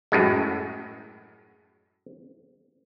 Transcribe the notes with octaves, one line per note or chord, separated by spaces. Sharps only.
F#2 A2 G#3